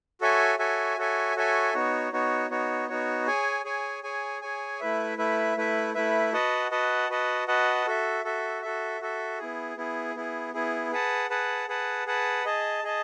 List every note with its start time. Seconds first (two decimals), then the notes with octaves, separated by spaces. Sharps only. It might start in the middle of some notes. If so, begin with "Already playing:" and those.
0.21 F#4 A4 C#5 E5 G#5
0.59 F#4 A4 C#5 E5 G#5
0.97 F#4 A4 C#5 E5 G#5
1.36 F#4 A4 C#5 E5 G#5
1.74 B3 D#4 F#4 C#5
2.12 B3 D#4 F#4 C#5
2.50 B3 D#4 F#4 C#5
2.89 B3 D#4 F#4 C#5
3.27 G#4 C#5 G#5
3.65 G#4 C#5 G#5
4.03 G#4 C#5 G#5
4.42 G#4 C#5 G#5
4.80 A3 E4 B4 E5
5.18 A3 E4 B4 E5
5.57 A3 E4 B4 E5
5.94 A3 E4 B4 E5
6.33 F#4 B4 D#5 F#5 A5
6.71 F#4 B4 D#5 F#5 A5
7.10 F#4 B4 D#5 F#5 A5
7.48 F#4 B4 D#5 F#5 A5
7.86 F#4 A4 E5
8.25 F#4 A4 E5
8.62 F#4 A4 E5
9.01 F#4 A4 E5
9.38 B3 E4 G#4
9.77 B3 E4 G#4
10.15 B3 E4 G#4
10.54 B3 E4 G#4
10.91 G#4 B4 F#5 A5
11.30 G#4 B4 F#5 A5
11.68 G#4 B4 F#5 A5
12.06 G#4 B4 F#5 A5
12.45 G#4 D#5 A5
12.83 G#4 D#5 A5